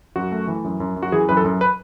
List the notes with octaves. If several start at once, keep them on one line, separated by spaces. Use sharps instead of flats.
F#2 F#4
A3
E3
F#2
F#2
F#2
F#4
E3 G#4
F#2 B4
A4
F#2
B4